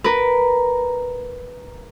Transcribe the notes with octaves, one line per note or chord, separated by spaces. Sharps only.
A#4 B4